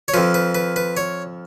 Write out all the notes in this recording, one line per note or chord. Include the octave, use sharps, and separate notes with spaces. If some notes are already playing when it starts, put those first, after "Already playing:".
C#5
F2 F3 B4
B4
B4
B4
C#5